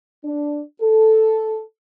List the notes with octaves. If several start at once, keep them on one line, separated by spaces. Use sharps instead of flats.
D4
A4